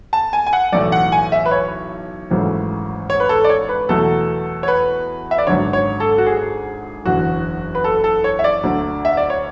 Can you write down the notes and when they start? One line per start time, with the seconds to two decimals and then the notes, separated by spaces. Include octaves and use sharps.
0.13 A5
0.33 G#5
0.47 G#5
0.53 F#5
0.72 B1 A2 E3 A3 D5
0.92 F#5
1.12 G#5
1.32 E5
1.46 B4
1.51 C#5
2.30 G#1 F#2 C#3 E3 A3
3.10 C#5
3.20 B4
3.29 A4
3.44 D5
3.49 C#5
3.69 B4
3.89 E2 B2 F#3 A3 A4
4.63 C#5
4.68 B4
5.31 E5
5.38 D5
5.47 G#1 F#2 D3 C#5
5.73 C#5
6.00 A4
6.18 F#4
6.27 G#4
7.05 F#1 E2 D3 F#4
7.75 B4
7.84 A4
8.04 A4
8.24 C#5
8.39 E5
8.44 D5
8.64 D2 D3 F#3 A3
9.05 E5
9.17 D5
9.30 C#5